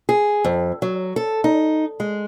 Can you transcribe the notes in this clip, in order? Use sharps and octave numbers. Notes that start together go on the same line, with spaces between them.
G#4
F2
F#3
A4
D#4
G#3